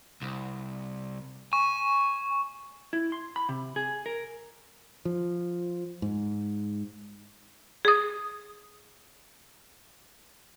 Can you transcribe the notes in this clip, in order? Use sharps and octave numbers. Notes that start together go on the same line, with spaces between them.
C2
G#5 C#6
E4
C6
B5
C3
G#4
A#4
F3
G#2
G#4 D#6